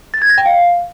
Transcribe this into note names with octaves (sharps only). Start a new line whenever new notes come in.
A6
G#6
A#6
G5
F5